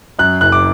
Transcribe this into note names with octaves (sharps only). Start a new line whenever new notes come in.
F#2 F#6
F#1 F#6
D6